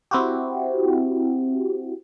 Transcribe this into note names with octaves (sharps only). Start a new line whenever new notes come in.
C4 E4 F#4 G4